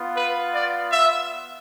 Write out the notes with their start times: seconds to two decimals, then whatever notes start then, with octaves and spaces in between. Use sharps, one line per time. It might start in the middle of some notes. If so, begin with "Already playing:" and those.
Already playing: B3 F4
0.13 B4
0.53 D5
0.92 E5